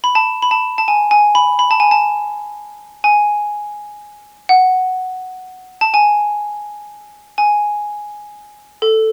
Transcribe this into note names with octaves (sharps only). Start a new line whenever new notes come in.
B5
A5
B5
A5
A5
G#5
G#5
B5
B5
A5
G#5
A5
G#5
F#5
A5
G#5
G#5
A4